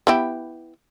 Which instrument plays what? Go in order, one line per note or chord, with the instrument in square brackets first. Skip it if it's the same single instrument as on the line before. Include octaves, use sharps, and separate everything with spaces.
[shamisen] B3 E4 G4